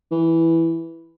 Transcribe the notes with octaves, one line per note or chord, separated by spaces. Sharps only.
E3